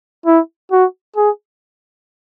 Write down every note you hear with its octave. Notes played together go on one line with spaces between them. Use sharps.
E4
F#4
G#4